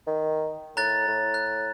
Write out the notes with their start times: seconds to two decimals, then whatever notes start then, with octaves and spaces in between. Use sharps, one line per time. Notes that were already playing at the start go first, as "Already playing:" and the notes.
0.07 D#3
0.77 A2 A#5 F#6 A6
1.08 A2
1.34 F#6